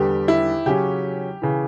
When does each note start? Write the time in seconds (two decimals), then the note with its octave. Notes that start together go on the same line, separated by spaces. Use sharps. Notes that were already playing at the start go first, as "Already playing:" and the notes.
Already playing: E2 D3 G3 G4
0.28 E4
0.66 C#3 F#3 C#4 G4
1.42 C#3 E3